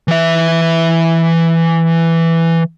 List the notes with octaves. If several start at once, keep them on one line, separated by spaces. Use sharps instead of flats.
E3 E5